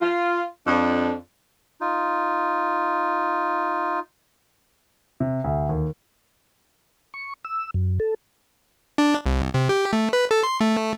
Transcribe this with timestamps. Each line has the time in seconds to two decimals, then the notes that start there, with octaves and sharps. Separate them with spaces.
0.01 F4
0.67 F2 D4
1.81 D#4 F4
5.20 C3
5.44 D2
5.69 D#2
7.14 C#6
7.45 E6
7.74 F#2
8.00 A4
8.98 D4
9.26 C2
9.54 C3
9.69 G4
9.93 A3
10.13 B4
10.31 A4
10.43 C6
10.61 A3